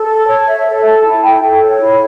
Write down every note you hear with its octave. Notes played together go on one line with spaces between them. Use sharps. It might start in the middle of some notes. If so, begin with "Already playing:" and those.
Already playing: A4
A5
C#5
E5
A4
A5
E4
G5
A4
C#5
E4